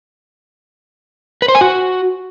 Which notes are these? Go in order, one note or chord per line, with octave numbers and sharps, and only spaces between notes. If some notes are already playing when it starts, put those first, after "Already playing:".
B4
C5
G#5
F#4